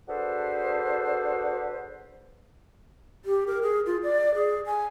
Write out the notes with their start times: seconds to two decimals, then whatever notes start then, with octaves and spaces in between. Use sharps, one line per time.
0.08 D4 F#4 G#4 A4 B4 C5
3.25 G4
3.47 A#4
3.62 G#4
3.86 F4
4.03 D5
4.35 G#4
4.66 G#5